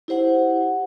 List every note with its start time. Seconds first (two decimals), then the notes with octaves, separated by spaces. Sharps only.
0.08 E4 G4 C5 F#5